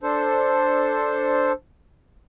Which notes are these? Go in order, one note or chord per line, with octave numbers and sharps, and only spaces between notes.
D4 A4 C5